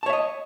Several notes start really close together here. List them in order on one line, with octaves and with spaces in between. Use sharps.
A5 C#5 E5 D#5